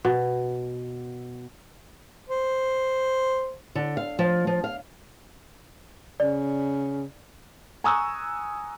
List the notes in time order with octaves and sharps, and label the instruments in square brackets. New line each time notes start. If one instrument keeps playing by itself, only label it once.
[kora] B2
[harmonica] C5
[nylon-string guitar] D3
F5
F3
F3
F5
[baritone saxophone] C#3 [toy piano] D5
[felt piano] G#5 A#5 C#6 D#6 E6 F#6